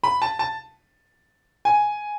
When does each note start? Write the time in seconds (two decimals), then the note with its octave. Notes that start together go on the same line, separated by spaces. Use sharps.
0.04 B5
0.22 A5
0.39 A5
1.65 G#5